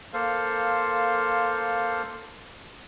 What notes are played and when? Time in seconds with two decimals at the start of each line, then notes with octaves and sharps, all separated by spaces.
0.13 A#3 A4 C5 F5